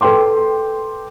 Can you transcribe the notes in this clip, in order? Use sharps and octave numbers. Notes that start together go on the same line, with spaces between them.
A4 B4 G5 C6 D6